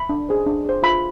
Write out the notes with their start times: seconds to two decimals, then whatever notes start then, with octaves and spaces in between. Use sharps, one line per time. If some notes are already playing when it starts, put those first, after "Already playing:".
Already playing: B5
0.09 D4
0.29 G#4 C5
0.46 D4
0.65 G#4 C5
0.83 F4 B5